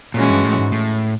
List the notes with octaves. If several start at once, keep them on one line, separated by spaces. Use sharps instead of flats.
A#2 E3 G#3 C#4 F#4
G2
A2
G#2
A2